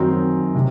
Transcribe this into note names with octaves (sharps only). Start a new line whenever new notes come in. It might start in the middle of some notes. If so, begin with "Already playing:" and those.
Already playing: F#2 D#3 F#3 C4 D#4 A#5
C3